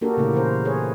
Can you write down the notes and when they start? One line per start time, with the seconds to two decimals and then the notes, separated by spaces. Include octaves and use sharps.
0.01 A#3 D4 F#4 G4 A4 A#4
0.17 A#2 C#3 A3 C#4 E4
0.34 E3 A#4 C5
0.65 G#4 B4 C#5